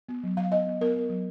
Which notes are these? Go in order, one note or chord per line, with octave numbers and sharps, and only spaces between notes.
B3
F#3
F#3 F5
B3 D#5
B3
B3 A#4
B3
F#3